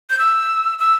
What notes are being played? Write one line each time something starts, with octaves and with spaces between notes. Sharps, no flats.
G6
E6
E6